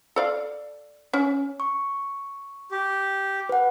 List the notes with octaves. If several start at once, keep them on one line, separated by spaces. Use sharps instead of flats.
A4 D5 F5
C#4
C#6
G4
B4 F#5